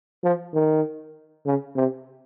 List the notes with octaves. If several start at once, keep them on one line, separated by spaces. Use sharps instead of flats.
F3
D#3
C#3
C3